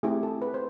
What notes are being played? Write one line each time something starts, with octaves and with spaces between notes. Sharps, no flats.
A3 C4 E4 G4 G#4
A4
B4
C5